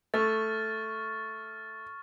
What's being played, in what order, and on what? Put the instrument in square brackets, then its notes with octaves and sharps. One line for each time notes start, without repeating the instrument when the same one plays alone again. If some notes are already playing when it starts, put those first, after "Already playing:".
[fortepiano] A3 [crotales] C#6 F6 A6